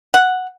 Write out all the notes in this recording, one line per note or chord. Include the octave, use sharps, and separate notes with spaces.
F#5